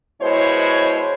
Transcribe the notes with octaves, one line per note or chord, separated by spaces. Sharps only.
B2 G#3 E4 C5 C#5